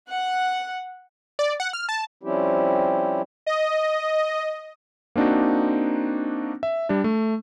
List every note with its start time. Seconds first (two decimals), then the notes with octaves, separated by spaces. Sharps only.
0.10 F#5
1.39 D5
1.60 F#5
1.73 F6
1.89 A5
2.23 F3 G3 C4 C#4 E4 G4
3.46 D#5
5.16 A#3 C4 D4 D#4 F#4
6.63 E5
6.89 G3 D4
7.04 A3